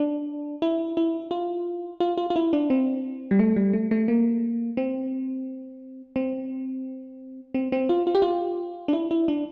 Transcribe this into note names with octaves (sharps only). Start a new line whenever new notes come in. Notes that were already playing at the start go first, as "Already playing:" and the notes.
Already playing: D4
E4
E4
F4
F4
F4
F4
E4
D4
C4
G3
A3
G3
A3
A3
A#3
C4
C4
C4
C4
F4
F4
G4
F4
D4
E4
E4
D4